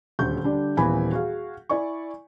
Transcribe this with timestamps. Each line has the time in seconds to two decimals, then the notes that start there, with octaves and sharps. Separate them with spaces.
0.19 D#1 D2 C#6 G6
0.44 D3 G3 D4
0.77 D#1 A#2 E3 B3 G#5 B5
1.12 F#4 G#4 F5
1.69 E4 D5 G#5 C#6